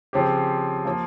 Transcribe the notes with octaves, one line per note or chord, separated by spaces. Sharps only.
C#3 F3 C4 G4
F3 A#3